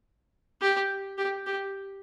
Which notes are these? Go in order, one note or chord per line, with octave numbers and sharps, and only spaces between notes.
G4
G4
G4